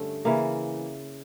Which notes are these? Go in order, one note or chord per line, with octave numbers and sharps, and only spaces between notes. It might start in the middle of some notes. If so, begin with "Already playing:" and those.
Already playing: G2 D3 A3 C#4
C#3 E3 A#3